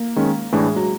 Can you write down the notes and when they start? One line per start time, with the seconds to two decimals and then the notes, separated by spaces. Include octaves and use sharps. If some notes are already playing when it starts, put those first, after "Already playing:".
Already playing: A#3
0.16 D#3 G#3 C#4
0.52 A2 E3 G#3 A3 D4
0.76 F#3